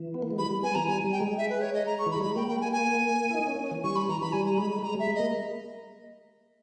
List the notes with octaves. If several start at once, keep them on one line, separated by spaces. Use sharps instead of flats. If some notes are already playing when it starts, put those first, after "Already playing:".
Already playing: E3
B3
A#3
G#3
G3 B5
G3
B3 G#5
G3
E3 A#5
G3 G#5
G3
G5
G#3
E5
B4
C#5
D#5
A#5
C#6
E3 B5
G3
G#3 B5
A#3 G5
G5
G#5
G#5
E4
D#4
C#4
C#4
E3
G3 C#6
B5
E3 A#5
E3 B5
G3 G#5
A#5
G#3 B5
B5
G#3 A#5
G3 E5
G#3
A#3 D#5